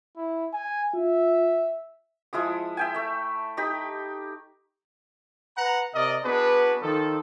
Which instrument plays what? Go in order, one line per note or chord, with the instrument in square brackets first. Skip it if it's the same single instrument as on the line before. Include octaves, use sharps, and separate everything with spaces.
[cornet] E4
G#5
[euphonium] F4 [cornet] E5
[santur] F3 G#3 E4 D#6
E5 G5 G#5
A3 E5
D#4 G4 B5 D#6
[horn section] B4 F#5 A#5
C3 A#4 D5 D#5
B3 D4 F#4 G#4 B4
D#3 F3 A4